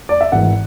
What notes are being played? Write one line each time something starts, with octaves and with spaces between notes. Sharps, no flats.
D5
E5
G#1 G#2 E3 F#5